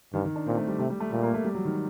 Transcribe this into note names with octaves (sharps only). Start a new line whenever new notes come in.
G2 D#3
D#3
D4
A#2 C4
A3
G3
C3 A3
G3
A3
A#2 A3
A#3
A3
G3
F#3
D#3